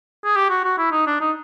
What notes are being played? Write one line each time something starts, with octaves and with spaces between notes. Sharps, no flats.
G#4
G4
F#4
F#4
E4
D#4
D4
D#4